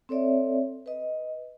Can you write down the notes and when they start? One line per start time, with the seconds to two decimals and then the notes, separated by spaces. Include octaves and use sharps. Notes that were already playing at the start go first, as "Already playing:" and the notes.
0.09 C4 A4 C#5 D5 E5
0.86 B4 D#5